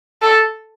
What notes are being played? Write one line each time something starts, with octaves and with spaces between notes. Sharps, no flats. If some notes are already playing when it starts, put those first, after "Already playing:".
A4